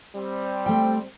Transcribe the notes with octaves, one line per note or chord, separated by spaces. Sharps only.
G3 C4
A3 G5